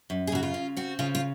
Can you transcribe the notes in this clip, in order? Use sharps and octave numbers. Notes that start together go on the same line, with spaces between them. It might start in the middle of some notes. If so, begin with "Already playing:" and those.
F#2
G#4
C#3 F#4
F4
C#3
C4 F#4
C#3 F4
F4